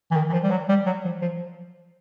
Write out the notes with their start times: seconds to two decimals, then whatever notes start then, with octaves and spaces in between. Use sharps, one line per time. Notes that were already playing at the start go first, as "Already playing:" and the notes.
0.11 E3
0.16 D#3
0.29 E3
0.33 F3
0.44 G3
0.51 F#3
0.69 G3
0.86 F#3
1.05 F3
1.22 F3